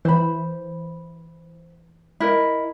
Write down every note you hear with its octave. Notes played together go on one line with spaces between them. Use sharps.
E3 C5 B5
E4 A#4 D#5